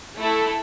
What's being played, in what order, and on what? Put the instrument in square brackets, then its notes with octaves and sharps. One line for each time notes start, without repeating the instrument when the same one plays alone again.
[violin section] A3 E4 A4